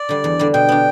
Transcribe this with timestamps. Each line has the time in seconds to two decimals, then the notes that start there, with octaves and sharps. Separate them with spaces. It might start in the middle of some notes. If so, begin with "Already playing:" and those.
Already playing: D5
0.09 D3 G3
0.24 E2
0.39 D3 G3
0.54 B2 G5
0.69 B3 D4